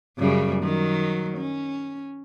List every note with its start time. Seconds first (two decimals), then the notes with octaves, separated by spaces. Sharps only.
0.18 F#2 C#3 G3
0.63 D#3 F#3
1.37 C#4